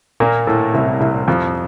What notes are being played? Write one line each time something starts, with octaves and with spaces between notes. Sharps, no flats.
A#2 A#3
A2 A3
C2 C3
C2 C3
F2 F3